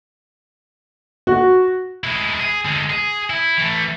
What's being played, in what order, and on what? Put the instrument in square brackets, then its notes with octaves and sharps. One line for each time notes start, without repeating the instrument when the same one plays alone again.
[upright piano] F#4
[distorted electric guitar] G#3 E4
G#4
D3 G#3
G#4
E4
E3 A3